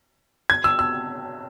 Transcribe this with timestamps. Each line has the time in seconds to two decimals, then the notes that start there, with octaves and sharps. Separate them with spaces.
0.50 G#6
0.64 E6
0.79 E6